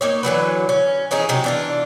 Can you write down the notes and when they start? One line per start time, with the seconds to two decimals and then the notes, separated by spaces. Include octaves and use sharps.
0.01 A#3 D#4 C#5
0.23 D3 E3 F#3 B4
0.69 C#4
1.11 E3 C#4 D#4 G#4
1.29 C3 F#3 D#4
1.44 E3 D4 F4